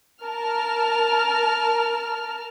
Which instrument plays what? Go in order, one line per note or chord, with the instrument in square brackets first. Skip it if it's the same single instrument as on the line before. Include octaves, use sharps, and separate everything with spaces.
[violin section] A#4 A5 F6